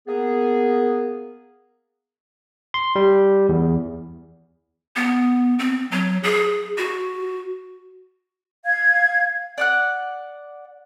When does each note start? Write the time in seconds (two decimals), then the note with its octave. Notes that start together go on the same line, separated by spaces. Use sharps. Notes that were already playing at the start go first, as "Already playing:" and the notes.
0.08 A#3 B3 G#4
2.74 C6
2.95 G3
3.49 E2
4.96 B3
5.59 C4
5.91 F#3
6.23 G#4
6.78 F#4
8.65 F5 G#6
9.58 D5 F#5 F#6